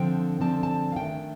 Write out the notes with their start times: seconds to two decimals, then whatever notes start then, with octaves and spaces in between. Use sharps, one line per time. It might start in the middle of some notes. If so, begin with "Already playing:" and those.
Already playing: D3 F3 C4 G5
0.40 D3 F3 C4 A5
0.63 A5
0.92 F5
0.96 D#3 A3 D4 G5